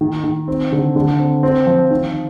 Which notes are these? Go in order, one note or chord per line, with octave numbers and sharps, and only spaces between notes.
D#3
D#3
C4
D3
D3
C4
C4
F3
D#3